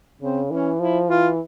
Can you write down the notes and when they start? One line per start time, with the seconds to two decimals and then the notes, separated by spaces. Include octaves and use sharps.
0.21 C#3 C4
0.50 E3 C#4
0.79 F3 E4
1.09 E3 F4